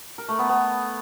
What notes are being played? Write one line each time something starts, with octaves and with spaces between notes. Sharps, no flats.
A#4
A3
B3
B3